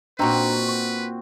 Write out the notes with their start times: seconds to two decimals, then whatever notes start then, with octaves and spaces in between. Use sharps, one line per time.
0.19 A#2 C4 D4 D#4 F#4 B4 A#5
0.69 C#6